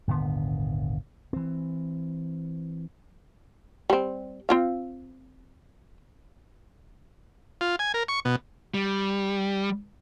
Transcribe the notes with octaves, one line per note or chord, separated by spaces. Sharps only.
D#1 G#1 D3 B3
E3 C4
G3 C4
C4 F4 F5
F4
G#5
A#4
C#6
B2
G3